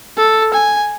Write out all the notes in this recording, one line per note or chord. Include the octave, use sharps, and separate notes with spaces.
A4
G#5